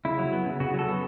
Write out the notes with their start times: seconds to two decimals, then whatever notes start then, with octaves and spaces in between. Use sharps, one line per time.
0.05 C#3 E4
0.19 F#3
0.33 B3
0.46 C#3
0.60 C#3 F#4
0.74 F#3 A4
0.88 B3